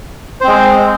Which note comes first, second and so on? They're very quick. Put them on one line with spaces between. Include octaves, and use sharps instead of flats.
C5 C4 G#3